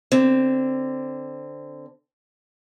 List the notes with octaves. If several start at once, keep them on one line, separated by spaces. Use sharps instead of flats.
D3 C4